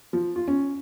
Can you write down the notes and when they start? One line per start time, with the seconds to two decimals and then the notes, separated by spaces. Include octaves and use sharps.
0.13 F3
0.36 F4
0.48 C#4